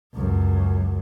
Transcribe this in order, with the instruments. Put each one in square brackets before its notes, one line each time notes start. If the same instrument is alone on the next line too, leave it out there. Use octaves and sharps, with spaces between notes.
[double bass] C#2 F#2